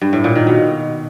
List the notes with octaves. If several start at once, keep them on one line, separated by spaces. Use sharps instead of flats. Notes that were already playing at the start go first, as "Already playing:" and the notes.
G2
A2
A#2
D#3
B2